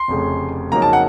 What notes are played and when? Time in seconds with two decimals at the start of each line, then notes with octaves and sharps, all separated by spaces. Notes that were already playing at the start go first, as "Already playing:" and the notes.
Already playing: C6
0.08 F1 F2 C#3 A3
0.72 F2 C#3 F#3 A#3 D#4 A#5
0.82 A5
0.93 F#5